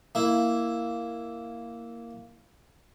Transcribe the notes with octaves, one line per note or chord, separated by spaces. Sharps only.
A#3 E4